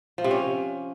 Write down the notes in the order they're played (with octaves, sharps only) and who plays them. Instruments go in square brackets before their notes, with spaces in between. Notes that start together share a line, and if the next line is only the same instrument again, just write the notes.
[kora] F3
C3
C#4